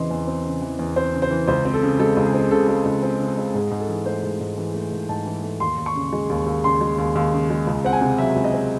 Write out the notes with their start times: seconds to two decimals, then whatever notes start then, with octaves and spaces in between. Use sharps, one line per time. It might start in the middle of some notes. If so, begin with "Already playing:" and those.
Already playing: E2 C#3 E3 C4 D#5 C6
0.11 E2
0.27 C4
0.45 C#3
0.62 E3
0.79 E2
0.96 C4 C5
1.13 C#3
1.22 C5
1.31 E3
1.48 C#2 C5
1.65 C4
1.74 A4
1.82 C#3
1.99 G#3 A4
2.17 C#2
2.26 G#4
2.34 C4
2.51 C#3 A4
2.68 G#3
2.85 C#2
3.03 C4
3.20 C#3
3.37 G#3
3.54 G#2 G#4
3.71 G#2
3.80 A4
3.88 E3
4.06 A3 C5
4.23 G#2
4.40 G#2
4.58 E3
4.74 A3
4.92 G#2
5.09 G#2 A5
5.26 E3
5.43 A3
5.60 D#2 C6
5.78 D#2
5.86 C#6
5.95 C#3
6.13 G#3
6.30 D#2
6.46 D#2
6.64 C#3 C6
6.81 G#3
6.98 D#2
7.15 D#2
7.33 C#3
7.50 G#3
7.67 C#2
7.84 C4 F#5
7.93 G#5
8.01 C3
8.18 F#3 E5
8.36 C#2
8.44 D#5
8.53 C4